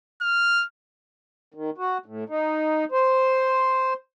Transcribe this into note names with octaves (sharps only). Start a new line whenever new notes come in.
F6
D#3
F#4
A2
D#4
C5